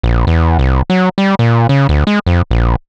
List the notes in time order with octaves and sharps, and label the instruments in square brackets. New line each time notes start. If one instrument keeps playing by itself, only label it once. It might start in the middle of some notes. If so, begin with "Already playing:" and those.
[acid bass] A#1
E2
C2
F#3
G3
A#2
C#3
D2
G#3
F2
A#1